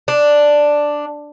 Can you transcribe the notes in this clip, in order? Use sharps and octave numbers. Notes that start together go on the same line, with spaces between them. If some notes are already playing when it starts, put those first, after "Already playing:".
D4